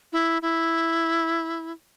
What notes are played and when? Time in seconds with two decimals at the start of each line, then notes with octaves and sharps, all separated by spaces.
0.13 E4
0.42 E4